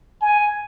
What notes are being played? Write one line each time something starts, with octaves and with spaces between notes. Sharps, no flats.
G#5